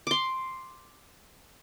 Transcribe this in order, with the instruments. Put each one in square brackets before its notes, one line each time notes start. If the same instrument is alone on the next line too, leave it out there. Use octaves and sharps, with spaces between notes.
[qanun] C6 D6